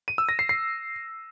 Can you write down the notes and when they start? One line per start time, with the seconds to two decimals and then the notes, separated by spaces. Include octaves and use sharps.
0.08 D#7
0.18 E6
0.29 A#6
0.39 C7
0.49 C7